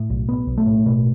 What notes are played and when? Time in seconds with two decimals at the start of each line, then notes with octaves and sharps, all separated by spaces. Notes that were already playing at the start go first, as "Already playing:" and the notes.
Already playing: A2
0.10 B1
0.29 B1 B3
0.47 B1
0.58 A3
0.67 A2
0.86 B2